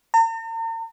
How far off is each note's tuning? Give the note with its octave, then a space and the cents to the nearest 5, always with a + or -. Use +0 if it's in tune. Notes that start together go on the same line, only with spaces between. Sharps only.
A#5 -45